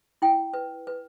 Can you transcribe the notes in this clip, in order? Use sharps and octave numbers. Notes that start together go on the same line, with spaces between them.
E4 G5
B4
B4